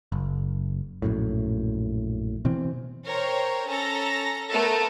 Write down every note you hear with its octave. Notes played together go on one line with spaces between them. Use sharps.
F#1
A#1 F#2 A2
B2 E3 C4
A#4 C5 C#5 G5
C#4 A4 A#5 A#6
A3 B3 A4 A#4